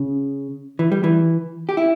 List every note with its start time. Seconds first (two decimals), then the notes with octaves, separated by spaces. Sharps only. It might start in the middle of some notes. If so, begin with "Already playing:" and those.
Already playing: C#3
0.79 E3
0.92 G3
1.04 E3
1.69 G4
1.77 E4